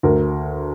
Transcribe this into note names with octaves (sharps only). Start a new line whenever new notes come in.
D2 A#4